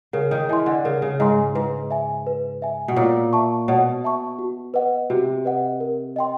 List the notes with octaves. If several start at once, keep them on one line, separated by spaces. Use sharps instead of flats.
C#3 A#4
D#3
E3 D#5 G#5 C6
D3
C#3 A#4
C#3
G#2 D#5 G#5 C6
G#2 B4
E5 G#5
B4
E5 G#5
B2
A#2 C#5
E5 A5 C#6
B2 C#5
E5 A5 C#6
F#4
B4 D#5 F#5
C3 F#4
B4 D#5 F#5
A#4
D#5 G5 C6